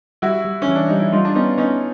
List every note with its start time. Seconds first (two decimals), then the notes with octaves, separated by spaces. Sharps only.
0.22 G3 E4 F#4
0.45 G3
0.62 C#4
0.68 E3
0.75 D4
0.88 G3 D#4
1.00 E4
1.13 G3 D#4 F4
1.25 D4
1.35 B3 C#4 D#4
1.58 B3 C#4 D#4